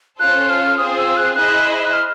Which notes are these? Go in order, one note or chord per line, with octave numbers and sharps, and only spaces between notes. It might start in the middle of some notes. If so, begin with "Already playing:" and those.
C#4 F4 A4 C5 F#6
F6
C4 F4 G#4 C5 D#6
D#6
E6
F#6
E4 G#4 C5 D#5 F#6
F#6
F6